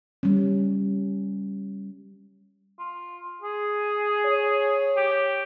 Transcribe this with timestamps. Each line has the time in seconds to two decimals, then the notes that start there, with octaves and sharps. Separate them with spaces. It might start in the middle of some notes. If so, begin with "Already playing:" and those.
0.23 G3 C#4
2.79 F4
3.42 G#4
4.26 C#5
4.97 G4